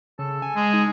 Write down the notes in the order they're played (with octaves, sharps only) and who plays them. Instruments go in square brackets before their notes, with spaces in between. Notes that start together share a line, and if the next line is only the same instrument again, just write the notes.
[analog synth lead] C#3 [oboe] A4
[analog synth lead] G#5
[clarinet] G#3 [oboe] G#4
[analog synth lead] D#4